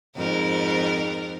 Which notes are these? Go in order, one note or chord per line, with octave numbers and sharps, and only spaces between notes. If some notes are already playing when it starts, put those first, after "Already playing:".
F2 G#2 A#4